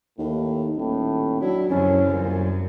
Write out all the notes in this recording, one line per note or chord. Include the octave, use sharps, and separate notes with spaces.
D#2 A2
D#1 A2
F#3 D4 E4
C2 F#2 D3 C#4
F#2 A#2